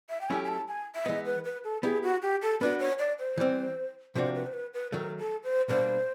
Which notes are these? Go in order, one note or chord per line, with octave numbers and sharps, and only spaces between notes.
E5
G5
F#3 A3 C#4 E4 G4 G#5
G#5
A5
G#5
E5
E3 G#3 B3 D#5
B4
B4
A4
B3 E4 G4 G#4
F#4
G4
A4
B3 D4 F#4 B4
C#5
D5
C5
E3 G3 C4
C3 F3 A#3 D4 F#4 C5
B4
C5
B4
B4
D#3 F#3 A3 A#4
A4
C5
B2 G3 A#3 D4 C5